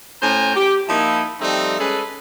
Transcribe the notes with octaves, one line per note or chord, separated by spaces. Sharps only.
A2 C#4 C5 G#5 A#5
G4
F3 A#3 D#4 E4
F3 G3 A3 C4 D#4
G#3 C#4 G#4 A4 B4